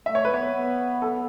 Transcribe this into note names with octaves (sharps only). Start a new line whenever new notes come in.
A3 E5
C#5
B4
B3 C#5
B3
A4